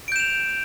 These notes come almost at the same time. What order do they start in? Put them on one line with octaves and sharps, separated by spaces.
D7 G6 E7 F7